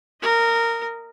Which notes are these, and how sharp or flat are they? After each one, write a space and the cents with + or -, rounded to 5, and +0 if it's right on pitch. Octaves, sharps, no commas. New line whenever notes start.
A#4 -15 D#5 +5